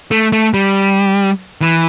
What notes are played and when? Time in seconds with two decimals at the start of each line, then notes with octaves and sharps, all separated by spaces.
0.11 A3
0.32 A3
0.54 G3
1.62 E3